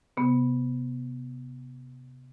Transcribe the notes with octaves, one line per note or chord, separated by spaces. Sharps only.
C3 B3